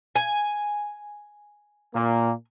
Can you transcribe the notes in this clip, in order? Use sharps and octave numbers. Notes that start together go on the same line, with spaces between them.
G#5
A#2 A#3